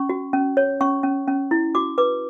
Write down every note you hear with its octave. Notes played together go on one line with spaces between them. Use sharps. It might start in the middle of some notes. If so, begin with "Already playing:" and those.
Already playing: C#4 C#6
F#4
C#4
C#5
C#4 C#6
C#4
C#4
E4
F#4 D6
B4 D6